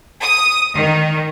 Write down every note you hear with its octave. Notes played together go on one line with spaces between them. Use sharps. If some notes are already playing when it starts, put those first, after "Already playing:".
D#6
D#3